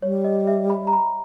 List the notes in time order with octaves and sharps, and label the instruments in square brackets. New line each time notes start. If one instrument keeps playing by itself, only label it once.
[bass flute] G3 [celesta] C#5
[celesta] D#5
E5
B5
A#5
B5